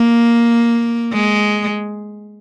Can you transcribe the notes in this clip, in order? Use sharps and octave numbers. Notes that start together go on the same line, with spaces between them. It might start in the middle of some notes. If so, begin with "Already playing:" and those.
Already playing: A#3
G#3